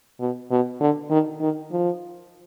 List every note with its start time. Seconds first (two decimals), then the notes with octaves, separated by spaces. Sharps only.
0.20 B2
0.51 B2
0.81 D3
1.10 D#3
1.41 D#3
1.72 F3